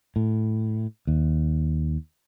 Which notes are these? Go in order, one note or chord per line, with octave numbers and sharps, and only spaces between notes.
A2
D#2